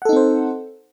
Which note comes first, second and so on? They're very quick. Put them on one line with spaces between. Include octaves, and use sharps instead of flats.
F#5 A4 D#4 C4 C5